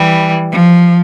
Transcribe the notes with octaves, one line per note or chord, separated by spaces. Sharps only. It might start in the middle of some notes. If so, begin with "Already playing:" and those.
Already playing: E3 G3
F3